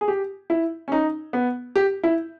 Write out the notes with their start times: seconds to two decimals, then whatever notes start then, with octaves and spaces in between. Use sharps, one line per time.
0.01 G#4
0.08 G4
0.50 E4
0.88 C#4
0.92 D#4
1.33 B3
1.76 G4
2.03 E4